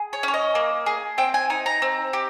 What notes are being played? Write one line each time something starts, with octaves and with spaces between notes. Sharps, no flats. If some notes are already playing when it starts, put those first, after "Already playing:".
Already playing: G#4
C#5
C#4 C#5
D#5
A#3
G#4
C4 G5
G#5
D#4 G#5
A#5
C4
G4